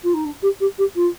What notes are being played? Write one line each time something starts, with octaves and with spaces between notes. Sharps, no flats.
F4
D#4
D4
G4
G4
G4
F4